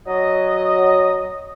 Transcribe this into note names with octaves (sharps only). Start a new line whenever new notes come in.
F#3 D#5